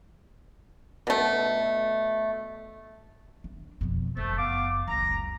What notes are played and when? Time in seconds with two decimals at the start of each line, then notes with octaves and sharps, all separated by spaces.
1.07 B2 A3
3.44 D4
3.81 F2 B2
4.17 F#1 F3 A3
4.38 B3 F5 D6
4.87 F#1 C#2 A#5